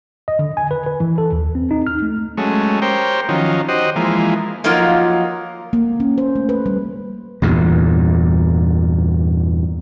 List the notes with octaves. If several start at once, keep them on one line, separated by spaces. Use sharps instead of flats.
D#5
D3
G#5
B4
B4
E3
A4
D#2
C4
D#4
F6
A3
F#3 G#3 A3 C#4
G4 A#4 C5 C#5 G5
D#3 F3 F#3 C#4
F#4 G4 C5 D#5
E3 F3 G#3 A#3
F3 F#3 A#3 D#4 F4 A#4
A#3
C#4
C5
A3
B4
G3
E2 G2 A#2